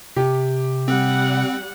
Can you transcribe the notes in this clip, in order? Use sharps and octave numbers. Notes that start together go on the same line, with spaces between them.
C3 G4
G3 C4 F#5